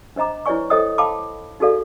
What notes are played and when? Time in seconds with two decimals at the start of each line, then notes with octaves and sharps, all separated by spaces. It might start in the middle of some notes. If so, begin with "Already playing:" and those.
0.16 D4 C5 D#5 A#5 D6
0.46 E4 B4 C#5 D5 G#5 C#6
0.70 A4 C5 C#5 D#5 G5 D#6
0.98 F5 G5 A5 B5 D6
1.60 D#4 F#4 G#4 A4 D5 F5